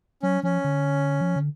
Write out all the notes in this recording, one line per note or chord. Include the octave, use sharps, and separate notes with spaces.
F#3 C#4
F3 C#4
D3
F3
D3